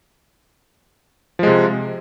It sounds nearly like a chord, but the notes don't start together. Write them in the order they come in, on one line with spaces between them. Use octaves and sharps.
F3 G#3 C3